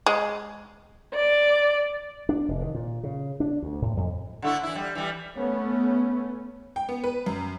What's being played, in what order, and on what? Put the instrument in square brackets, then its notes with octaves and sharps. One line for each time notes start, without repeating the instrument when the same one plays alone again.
[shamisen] G#3
[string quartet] D5
[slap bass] D4
F1
D#3
A#2
C#3
D4
D2
A2
F2
[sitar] D3 A3 E4
E3 E4
G3
E3 G3
[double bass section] A3 B3 C#4
[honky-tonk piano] G5
B3
B4
F#2